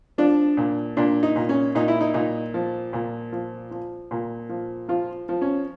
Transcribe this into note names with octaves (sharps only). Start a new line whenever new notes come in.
F3 D4
A#2
A#2 D4
D#4
A#2
C#4
A#2 D#4
E4
D#4
A#2 D#4
F3
A#2
F3
F3
A#2
F3
F3 F4
F3
C#4